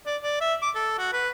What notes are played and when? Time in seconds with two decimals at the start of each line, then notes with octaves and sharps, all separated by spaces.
0.06 D5
0.23 D5
0.41 E5
0.62 D6
0.75 A4
0.98 F#4
1.13 B4